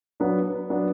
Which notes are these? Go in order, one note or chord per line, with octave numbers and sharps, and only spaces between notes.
F#3 B3 D4
F#3 B3 D4